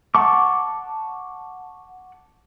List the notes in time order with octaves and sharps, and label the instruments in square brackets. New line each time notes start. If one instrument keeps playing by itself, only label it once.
[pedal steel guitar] F#5 A5 C#6 D6